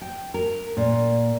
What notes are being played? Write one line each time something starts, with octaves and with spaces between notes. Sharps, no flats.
G5
A#4
A#2